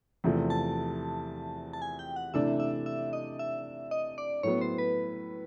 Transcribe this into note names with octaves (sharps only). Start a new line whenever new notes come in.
E2 C3 F3 A3
A5
A5
G#5
G5
F#5
C3 E3 A3 D4 E5
E5
E5
D#5
E5
D#5
D5
A2 F#3 B3 C#5
C5
B4